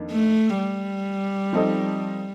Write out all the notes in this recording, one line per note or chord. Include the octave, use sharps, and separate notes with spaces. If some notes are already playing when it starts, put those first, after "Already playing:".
Already playing: F2 D#3 A#3 D4
A3
G3
F3 C4 D#4 A4 D#5